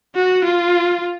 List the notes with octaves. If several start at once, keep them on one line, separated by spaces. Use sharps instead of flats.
F#4
F4